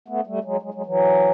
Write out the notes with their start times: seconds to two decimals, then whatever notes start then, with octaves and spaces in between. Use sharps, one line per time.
0.08 A3 B3
0.27 G3 A3
0.44 F#3 G#3
0.62 F#3 G#3
0.74 F#3 G#3
0.86 E3 F#3